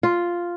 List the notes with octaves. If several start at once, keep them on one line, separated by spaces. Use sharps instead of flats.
F4